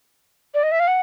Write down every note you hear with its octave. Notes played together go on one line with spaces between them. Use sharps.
D5
D#5
E5
F5
F#5